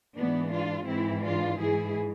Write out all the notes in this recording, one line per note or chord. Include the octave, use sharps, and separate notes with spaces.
G#2 E3 B3 D4
D4 F4
G#2 E3 C4 E4
D4 F4
G#2 E3 E4 G#4